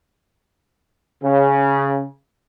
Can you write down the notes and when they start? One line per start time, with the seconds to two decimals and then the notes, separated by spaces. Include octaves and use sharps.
1.22 C#3